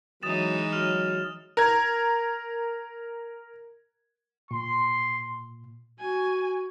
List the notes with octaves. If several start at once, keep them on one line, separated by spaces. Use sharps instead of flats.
E3 F#3 G#3 D#4 D#6 A6 E7
F#3 F6 F7
A#4 G#6
A#2 C6
F#4 G#5